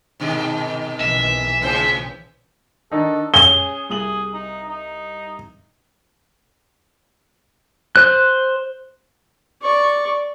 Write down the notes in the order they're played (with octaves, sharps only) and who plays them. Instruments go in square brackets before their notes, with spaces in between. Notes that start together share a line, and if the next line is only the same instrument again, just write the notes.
[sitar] G#2 B2 D#3
[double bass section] B1 E3 [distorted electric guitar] E5
[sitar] A2 C#3 C5
[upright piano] D#3 D4 D#4 [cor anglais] A4
[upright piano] C#4 G#5 [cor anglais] G#4 [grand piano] G7
[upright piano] C2 D#6 F#7 [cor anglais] G#4
[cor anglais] D#4
D#4
[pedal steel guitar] C5 F#6
[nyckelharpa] D5 C#6